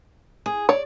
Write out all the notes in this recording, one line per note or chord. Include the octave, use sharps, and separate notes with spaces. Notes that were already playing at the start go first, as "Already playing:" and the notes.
G#4
C#5 D5